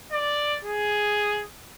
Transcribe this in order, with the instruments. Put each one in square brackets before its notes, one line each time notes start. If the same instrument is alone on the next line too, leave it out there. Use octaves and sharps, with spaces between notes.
[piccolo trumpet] D5
G#4